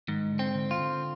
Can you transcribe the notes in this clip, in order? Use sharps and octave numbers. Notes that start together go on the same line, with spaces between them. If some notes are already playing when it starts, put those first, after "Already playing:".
G#2 D#3
D3
C4
D3
F4
D3